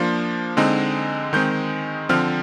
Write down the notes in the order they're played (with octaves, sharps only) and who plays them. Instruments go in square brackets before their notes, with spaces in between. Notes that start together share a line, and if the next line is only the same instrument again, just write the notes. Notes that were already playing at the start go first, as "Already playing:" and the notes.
Already playing: [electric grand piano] F3 A#3 D4 F4
D3 G#3 C4 D#4
D#3 G#3 C4 G6
D3 F3 C4 F6